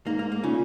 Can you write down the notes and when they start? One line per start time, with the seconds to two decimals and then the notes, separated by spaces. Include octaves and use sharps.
0.07 G#2 A#3
0.19 A#3
0.32 A#3
0.43 A#2 C#3 C#4